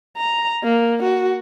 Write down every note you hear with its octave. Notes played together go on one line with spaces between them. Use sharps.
A#5
A#3
F#4